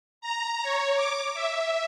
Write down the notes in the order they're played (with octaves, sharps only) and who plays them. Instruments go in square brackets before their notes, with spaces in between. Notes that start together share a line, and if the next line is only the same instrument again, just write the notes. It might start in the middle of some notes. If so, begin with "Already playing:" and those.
[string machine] A#5
C#5
D6
E5